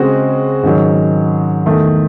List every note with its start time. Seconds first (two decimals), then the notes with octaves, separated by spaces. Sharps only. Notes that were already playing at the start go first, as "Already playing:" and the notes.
Already playing: C#3 G#3 C4 F#4
0.63 G#2 D#3 F#3 C#4
1.66 E2 D#3 A3